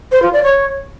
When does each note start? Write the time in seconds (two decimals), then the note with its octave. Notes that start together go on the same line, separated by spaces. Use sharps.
0.11 C5
0.22 F4
0.33 D5
0.43 C#5